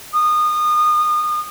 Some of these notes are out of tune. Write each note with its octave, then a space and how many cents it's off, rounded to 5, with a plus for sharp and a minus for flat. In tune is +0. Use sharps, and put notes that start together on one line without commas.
D#6 -30